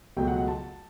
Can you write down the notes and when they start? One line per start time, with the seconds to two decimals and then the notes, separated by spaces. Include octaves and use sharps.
0.17 C#2 B2 F#3 A3 G5
0.28 F#5
0.38 F#5
0.48 A5